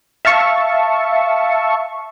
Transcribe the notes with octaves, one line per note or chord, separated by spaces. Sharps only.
E5 F5 A5 C#6